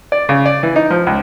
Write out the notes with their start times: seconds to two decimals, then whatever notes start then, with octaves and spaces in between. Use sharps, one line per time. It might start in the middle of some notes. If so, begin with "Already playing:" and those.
0.12 D5
0.29 C#3
0.46 D5
0.63 E3
0.76 D#4
0.90 F3
1.07 C#2